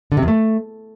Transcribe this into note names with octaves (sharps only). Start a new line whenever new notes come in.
D3
C3
E2
A3